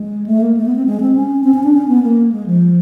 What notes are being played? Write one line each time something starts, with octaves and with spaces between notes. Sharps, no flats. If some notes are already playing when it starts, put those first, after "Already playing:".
Already playing: G#3
A3
A#3
A3
B3
C4
G#3
C4
C#4
C4
C#4
D4
C#4
B3
A#3
G#3
F3